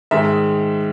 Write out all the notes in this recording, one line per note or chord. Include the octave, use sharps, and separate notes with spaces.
G#2 D#3 G#3 E5